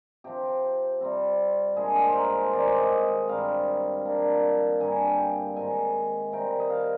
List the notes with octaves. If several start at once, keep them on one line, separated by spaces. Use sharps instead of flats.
C3 F3 C4 G4
C3 G3 C4
A#2 G#3 D4 G#4
G#4
C5
A#4
C5
D#3 G#3 C4 D5
C5
D5
D#5
D#5
G2 D#3 G3 C4 F5
D#3 A#3 D4
G2 D3 G3 A#3 G#5
G5
G#2 D#3 G#3 G#5
C3 D#3 G3 G5
D#5
F5